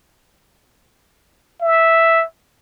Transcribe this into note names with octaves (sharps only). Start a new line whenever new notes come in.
E5